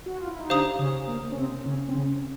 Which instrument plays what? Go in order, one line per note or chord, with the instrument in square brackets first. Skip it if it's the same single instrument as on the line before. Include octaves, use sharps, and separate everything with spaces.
[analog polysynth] F#4
F4
E4
D#4
[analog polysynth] D3 D4 [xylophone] G4 C5 F5 A#5 D#6
[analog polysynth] C#3 C#4
A#3
C#4
C3 C4
C#3 C#4
C4
C#3 C#4